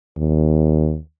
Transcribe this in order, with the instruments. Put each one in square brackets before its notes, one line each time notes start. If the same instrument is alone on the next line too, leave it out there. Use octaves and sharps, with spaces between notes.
[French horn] D#2